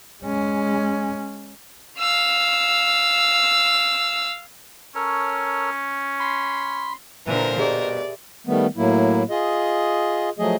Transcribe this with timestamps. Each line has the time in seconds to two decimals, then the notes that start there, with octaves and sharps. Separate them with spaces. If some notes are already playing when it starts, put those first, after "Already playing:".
0.23 G#3 C#4
2.00 F5 E6
4.95 C#4 A4 A#4 C#5
6.20 B5 C6
7.27 A#2 D3 E3 A#4 C5
7.59 B2 G4 G#4 D5 E5
8.47 D#3 G3 A3 B3
8.77 A2 F#3 A#3 E4
9.30 F4 G#4 D#5
10.39 F3 F#3 A3 G#4 D#5